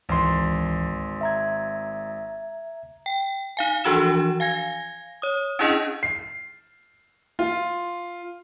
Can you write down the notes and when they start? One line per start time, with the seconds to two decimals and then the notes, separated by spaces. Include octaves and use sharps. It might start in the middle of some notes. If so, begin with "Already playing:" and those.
0.09 G#1 C#2 E3 C6
1.21 E5 A#5 G#6
3.06 G5
3.57 D#4 F5 G#5
3.84 E3 F3 D4 F#4 E6 E7
4.40 F5 G#5 G#6 A#6
5.22 C#5 D#6
5.59 C#4 D4 E4 G#4 D#5
6.03 C7
7.39 F4